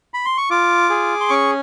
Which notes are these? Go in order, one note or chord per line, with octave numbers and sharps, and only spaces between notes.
B5
C6
C#6
F4 D6
G#4
C6
C#4 C#6